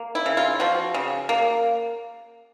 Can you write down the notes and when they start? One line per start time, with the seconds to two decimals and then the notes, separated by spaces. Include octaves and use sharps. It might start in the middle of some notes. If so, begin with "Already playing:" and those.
Already playing: A#3
0.15 E4
0.26 C#3
0.37 F4
0.60 F3 F#4
0.94 C#3
1.29 A#3